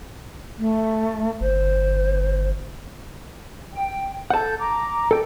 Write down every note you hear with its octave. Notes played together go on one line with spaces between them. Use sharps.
A3
G1 C5
G5
A4 F#5 A5 G6
A#5 D6
A4 G5